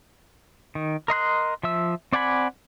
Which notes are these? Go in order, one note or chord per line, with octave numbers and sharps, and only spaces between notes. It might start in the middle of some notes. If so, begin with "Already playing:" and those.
D#3
A#4 D#5 C6 F#6
F3 E5 E6
C4 D5 F#5 G#5 B5